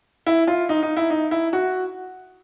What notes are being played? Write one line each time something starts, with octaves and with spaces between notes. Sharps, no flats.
E4
F4
D#4
D#4
E4
D#4
E4
F#4